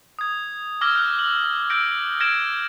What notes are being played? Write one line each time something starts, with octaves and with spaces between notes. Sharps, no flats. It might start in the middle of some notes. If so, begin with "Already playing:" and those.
D#6 G#6
D6 E6 F6 G#6 A#6 G7
F6 F#6
F#7
E6 G6 A#6 D7
F6 G#6 A#6 D7 E7